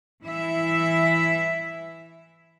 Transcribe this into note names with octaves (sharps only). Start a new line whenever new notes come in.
E3 E4 E5